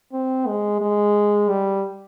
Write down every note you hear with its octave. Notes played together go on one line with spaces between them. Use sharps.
C4
G#3
G#3
G3